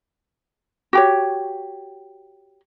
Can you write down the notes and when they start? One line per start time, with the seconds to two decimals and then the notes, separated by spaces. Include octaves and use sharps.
0.93 F#4 G4 C#5